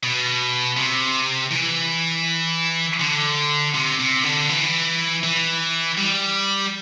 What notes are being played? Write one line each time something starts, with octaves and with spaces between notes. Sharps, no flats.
B2
C3
E3
D3
C3
C3
D3
E3
E3
G3